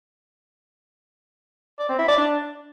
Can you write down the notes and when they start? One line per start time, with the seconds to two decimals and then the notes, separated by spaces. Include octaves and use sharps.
1.79 D5
1.89 C4
1.99 E4
2.08 D5
2.18 D4